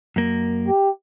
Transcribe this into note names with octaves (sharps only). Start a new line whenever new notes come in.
F#2 A#3
G4